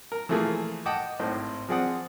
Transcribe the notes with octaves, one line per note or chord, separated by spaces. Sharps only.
A#4
E3 F3 A3 A#3 G#4
D#5 F#5 G5 A5 D6 D#6
G#1 A2 C5 C6
F3 C4 G#4 D5 F#5 D#6